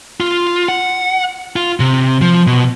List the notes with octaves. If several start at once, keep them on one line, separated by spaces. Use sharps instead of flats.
F4
F#5
F4
C3
F3
B2